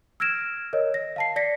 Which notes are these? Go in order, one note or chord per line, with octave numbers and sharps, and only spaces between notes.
E6 F6 G#6 A#6 D7 E7
A#4 C#5 D#5
A#6
F5 A5 C7
D5 A#6 B6 C#7